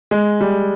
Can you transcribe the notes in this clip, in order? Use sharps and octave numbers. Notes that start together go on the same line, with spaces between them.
G#3
G3